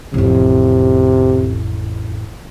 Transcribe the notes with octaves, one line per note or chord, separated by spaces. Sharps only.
A1 F2 C3